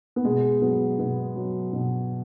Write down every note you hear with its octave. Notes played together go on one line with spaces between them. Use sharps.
B3
B2 G#3
F#3 B3
B2 B3
F#3
B2